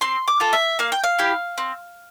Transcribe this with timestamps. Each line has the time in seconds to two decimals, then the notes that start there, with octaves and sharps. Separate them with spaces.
0.01 C4 C6
0.28 D6
0.40 F4 A4
0.53 E5
0.79 A#3 F5
0.92 G5
1.04 F5
1.19 E4 G4
1.58 C4